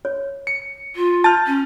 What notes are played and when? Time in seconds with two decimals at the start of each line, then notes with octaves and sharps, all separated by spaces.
0.05 C#5
0.47 C#7
0.96 F4
1.24 A5 F6 G6 A6
1.46 C#4